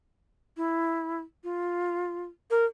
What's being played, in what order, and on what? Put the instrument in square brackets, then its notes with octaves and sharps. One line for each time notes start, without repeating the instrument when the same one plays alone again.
[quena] E4
F4
[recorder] A#4